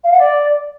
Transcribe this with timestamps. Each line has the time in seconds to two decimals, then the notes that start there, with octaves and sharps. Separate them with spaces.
0.04 F5
0.12 F#5
0.19 D5